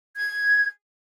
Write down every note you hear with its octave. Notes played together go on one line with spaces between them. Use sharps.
G#6